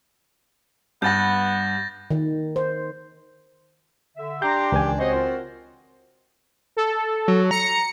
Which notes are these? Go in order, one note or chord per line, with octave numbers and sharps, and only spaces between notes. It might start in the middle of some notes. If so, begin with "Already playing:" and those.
G2 B3 F#5 G6 A6 A#6
D#3
C5
D3 E5
D4 G4 A#5 C6 G6
C#2 D#3 E3 G#5
C4 F#4 C5 C#5 D#5
F4 A#4
A4
F#3
A#5 C#7